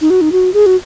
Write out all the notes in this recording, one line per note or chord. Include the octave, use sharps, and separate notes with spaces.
D#4
F#4
D#4
F#4
G#4
F#4